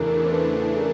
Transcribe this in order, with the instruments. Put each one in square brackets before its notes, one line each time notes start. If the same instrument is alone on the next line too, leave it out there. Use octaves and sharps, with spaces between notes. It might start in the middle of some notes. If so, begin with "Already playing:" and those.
Already playing: [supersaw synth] E2 C#3 E3 A3 D4 [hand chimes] G#4 A#4
[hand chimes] C5
A4 B4
G#4 A#4